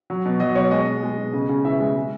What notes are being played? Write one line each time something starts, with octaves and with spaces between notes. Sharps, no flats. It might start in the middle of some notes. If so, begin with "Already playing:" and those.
F#3
B2
F#3 D#5
B2 C#5
G#3 D#5
B2
G#3
B2
C#3
C#3
E3 E5
G#3
G#3